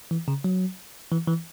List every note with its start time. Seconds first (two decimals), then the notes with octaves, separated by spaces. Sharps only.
0.11 E3
0.28 C#3
0.44 F#3
1.11 E3
1.28 E3